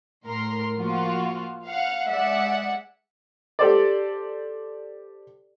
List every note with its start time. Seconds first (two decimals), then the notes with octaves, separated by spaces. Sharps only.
0.26 A2 A#4 C6
0.79 F3 A#3 F4 F#4
1.66 F5 F#5
2.09 G#3 G#4 D5 E5 F#5
3.59 G4 A4 C5 D5